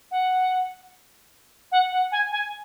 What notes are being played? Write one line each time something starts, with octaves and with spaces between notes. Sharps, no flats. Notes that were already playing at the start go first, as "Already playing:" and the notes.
F#5
F#5
F#5
G#5
G#5